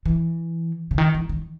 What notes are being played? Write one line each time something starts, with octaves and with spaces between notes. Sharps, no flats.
E3
C#3
D#3
E3
D#3